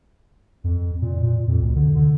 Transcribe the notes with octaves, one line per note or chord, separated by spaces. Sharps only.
F2
A#2
A#2
F2
D2
D3
D3